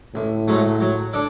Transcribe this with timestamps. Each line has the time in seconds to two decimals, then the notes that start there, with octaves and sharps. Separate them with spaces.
0.15 A1 A2
0.48 G#2 F#3 A3
0.80 F#3
1.13 D4 A4